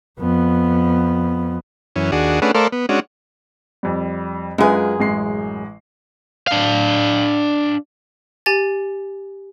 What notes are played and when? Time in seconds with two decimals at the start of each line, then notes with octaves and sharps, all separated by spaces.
0.20 F2 B3
1.96 F#2 E3 C#4
2.12 D#2 D4 F#4 G#4
2.42 A3 C#4 D4 G#4 B4 F#5
2.55 A3 A4 A#4 C5 D5 F5
2.72 B3
2.89 G#3 C#4 D4 F#4
3.83 F2 G3
4.58 F#2 G#3 F4 G#4 B4
4.99 A1 G#3 C7
6.47 D4 F5
8.46 G4 G#5 A6